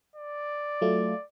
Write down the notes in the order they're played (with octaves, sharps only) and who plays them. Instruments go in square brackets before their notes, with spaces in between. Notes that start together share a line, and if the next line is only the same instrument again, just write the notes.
[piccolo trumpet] D5
[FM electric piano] F#3 A3 F4